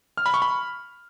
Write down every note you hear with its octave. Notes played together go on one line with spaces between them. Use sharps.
F6
B5
C#6
B5